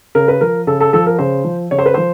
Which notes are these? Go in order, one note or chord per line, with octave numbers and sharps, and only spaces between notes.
C#3 A#4
B4
F3 A#4
C#3 A4
A4
F3 A4
A#4
C#3 C5
F3
C#3 C#5
C5
B4
F3 C5